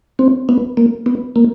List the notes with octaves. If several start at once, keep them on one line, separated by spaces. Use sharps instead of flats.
C4
B3
A#3
B3
A#3